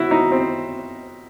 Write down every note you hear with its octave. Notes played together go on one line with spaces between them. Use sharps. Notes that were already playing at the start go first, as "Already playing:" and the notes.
Already playing: B2 E4 F#4
D#4
C4